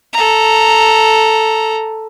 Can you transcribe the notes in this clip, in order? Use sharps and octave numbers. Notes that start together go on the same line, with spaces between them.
A4 A#5